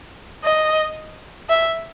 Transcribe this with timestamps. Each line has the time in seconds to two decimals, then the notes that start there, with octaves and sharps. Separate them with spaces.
0.44 D#5
1.49 E5